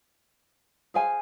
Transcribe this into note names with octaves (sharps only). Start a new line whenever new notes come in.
G#4 C5 F5 G#5